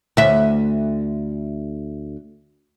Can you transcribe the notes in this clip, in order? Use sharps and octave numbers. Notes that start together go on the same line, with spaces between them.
D2 E5